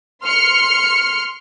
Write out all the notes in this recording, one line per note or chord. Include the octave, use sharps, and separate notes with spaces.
C6 F6 C#7